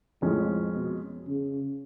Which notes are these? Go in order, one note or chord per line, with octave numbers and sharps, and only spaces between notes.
F2 A2 F3 G#3 C#4
B2
C#3